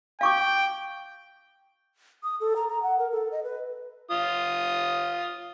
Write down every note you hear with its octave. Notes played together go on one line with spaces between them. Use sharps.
F5 G5 C#6 D6
D#6
A4
A#5
A#5
F#5
A#4
A4
D#5
B4
F4 D#6